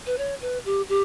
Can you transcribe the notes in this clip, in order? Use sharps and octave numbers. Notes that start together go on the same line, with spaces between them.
B4
C#5
B4
G4
G4